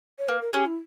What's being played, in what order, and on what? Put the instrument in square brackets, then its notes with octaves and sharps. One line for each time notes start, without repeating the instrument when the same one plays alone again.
[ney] C#5
[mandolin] A#3 [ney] B4
[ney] A#4
[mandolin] C#4 G#4 [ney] G4
[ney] E4